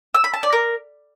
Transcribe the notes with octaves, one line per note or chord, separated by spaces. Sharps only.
E6
B5
A5
D5
A#4